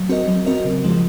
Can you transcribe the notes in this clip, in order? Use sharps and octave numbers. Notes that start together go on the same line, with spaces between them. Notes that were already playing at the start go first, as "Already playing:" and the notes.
Already playing: F#3
C4 F#4 A#4 D#5
F#3
C4 F#4 A#4 D#5
C#3
F3 G#3